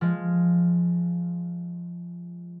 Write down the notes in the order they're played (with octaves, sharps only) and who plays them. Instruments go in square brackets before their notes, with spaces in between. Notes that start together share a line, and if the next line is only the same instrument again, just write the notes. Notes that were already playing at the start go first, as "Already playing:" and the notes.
[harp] F3 G#3